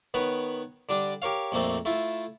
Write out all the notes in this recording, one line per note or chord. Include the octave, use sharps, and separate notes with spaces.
D#3 B3 B4 C#5
D3 G3 D4
G4 A#4 C#5 F5
A#1 F2 A3 A#3 C4
A3 E4 F4